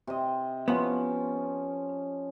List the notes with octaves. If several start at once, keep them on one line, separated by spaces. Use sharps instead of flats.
C3 D#5
F3 B3 C#4